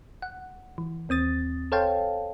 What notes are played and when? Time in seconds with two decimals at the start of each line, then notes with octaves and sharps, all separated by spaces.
0.22 F#5
0.78 E3
1.09 D#2 C4 D#6 A6
1.72 A4 C5 C#5 F5 G5 A5